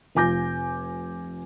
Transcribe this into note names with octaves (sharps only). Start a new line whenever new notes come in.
F1 F4 G#5 D6 G6 A#6